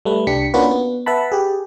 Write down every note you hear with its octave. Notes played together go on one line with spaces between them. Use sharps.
G3 A3 B4
C2 D4 G4 B6 C#7
A#3 C#4 D4 F4 F#4 B4
B3
B4 E5 F#5 A5 B5
G4 G#4